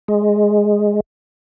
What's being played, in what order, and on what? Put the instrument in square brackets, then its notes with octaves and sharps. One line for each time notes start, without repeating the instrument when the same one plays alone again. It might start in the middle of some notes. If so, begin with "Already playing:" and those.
[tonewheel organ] G#3